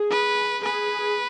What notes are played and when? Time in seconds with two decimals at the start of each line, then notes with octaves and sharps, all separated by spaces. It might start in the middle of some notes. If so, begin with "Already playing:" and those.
Already playing: G#4
0.11 B4
0.63 G#4 B4